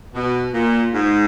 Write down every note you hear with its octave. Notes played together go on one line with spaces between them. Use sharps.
B2
A#2
G#2